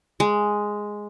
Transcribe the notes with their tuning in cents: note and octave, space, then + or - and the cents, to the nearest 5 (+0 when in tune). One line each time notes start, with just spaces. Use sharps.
G#3 +0